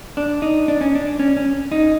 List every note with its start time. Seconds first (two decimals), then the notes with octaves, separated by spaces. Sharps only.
0.17 D4
0.42 D#4
0.68 D4
0.81 C#4
0.95 D4
1.19 C#4
1.37 C#4
1.72 D#4